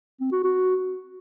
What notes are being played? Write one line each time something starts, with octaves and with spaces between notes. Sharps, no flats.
C4
F#4
F#4